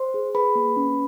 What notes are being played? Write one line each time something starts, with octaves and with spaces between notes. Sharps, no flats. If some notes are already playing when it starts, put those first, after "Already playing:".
Already playing: C5 C6
G#4
G#4 B4 B5
A#3
C#4